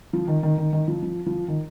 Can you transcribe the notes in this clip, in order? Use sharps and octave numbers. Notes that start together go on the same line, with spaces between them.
F3
D#3
D#3
D#3
D#3
F3
F3
F3
D#3